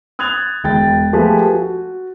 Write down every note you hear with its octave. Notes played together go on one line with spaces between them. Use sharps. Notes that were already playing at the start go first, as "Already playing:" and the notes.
D#6 F#6 G#6 A6 F7
E1 G5 A6
F3 A3 G4 G#4 B4
F#4